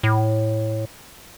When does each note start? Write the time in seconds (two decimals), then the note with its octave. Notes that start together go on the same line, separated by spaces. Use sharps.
0.03 A2